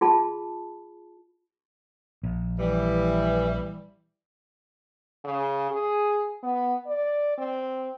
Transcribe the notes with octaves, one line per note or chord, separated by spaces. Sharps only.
F4 G#4 A5 B5
A#1
E3 G3
C#3
G#4
B3
D5
C4